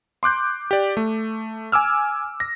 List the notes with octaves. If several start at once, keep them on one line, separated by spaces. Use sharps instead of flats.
C6 D6 F#6 G6
G4 D5
A3
G#5 D6 E6 F6
A#6